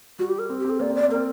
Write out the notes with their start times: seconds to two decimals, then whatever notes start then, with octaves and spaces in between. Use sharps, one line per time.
0.19 G3 F#4
0.29 G4
0.39 A#4
0.50 C4
0.60 G4
0.65 C4
0.70 A4
0.80 A#3 D5
0.90 C4
0.95 D5
1.01 C4
1.08 A#3
1.11 C4 A#4